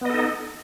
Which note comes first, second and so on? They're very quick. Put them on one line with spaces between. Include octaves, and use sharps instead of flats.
B3 D#5 A4 D#4